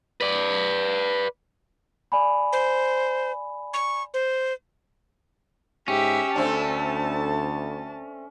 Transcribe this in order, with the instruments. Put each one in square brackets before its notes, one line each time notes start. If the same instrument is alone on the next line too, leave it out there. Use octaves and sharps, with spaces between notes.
[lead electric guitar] B4 D5
[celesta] D5 G#5 B5
[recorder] C5
C#6
C5
[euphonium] G#2 [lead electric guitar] C#4 [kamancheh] G4 E5
[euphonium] D2 [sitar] A3 C4 D4 [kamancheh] A5